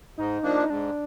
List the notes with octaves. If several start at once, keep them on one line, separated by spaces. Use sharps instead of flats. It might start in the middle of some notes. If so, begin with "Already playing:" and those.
G#2 D#4
F3 A#3 D4
D#4
G#2 D4